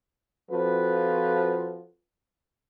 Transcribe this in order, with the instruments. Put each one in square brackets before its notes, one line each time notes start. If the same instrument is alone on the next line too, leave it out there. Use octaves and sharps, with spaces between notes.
[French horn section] F3 C4 F4 F#4 A4 B4